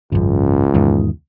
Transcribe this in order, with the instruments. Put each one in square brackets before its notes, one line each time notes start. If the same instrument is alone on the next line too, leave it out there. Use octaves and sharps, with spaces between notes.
[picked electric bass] G#1 F#2 [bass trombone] C#2
[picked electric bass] E2 G#2 D#3